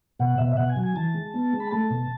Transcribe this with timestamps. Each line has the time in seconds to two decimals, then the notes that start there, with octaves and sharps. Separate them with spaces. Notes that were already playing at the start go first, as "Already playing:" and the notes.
0.19 B2 F#5
0.38 B2 E5
0.52 E5
0.57 B2 F#5
0.69 G#5
0.76 F#3
0.83 G#5
0.96 E3 A5
1.14 G#3
1.34 B3
1.53 G#3
1.60 B5
1.71 A3 A5
1.90 B2